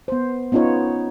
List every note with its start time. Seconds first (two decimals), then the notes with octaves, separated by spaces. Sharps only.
0.08 B3 C5
0.52 B3 C#4 D#4 F4 C#5